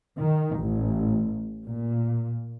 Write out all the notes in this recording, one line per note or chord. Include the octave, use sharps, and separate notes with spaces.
D#3
A1
A#2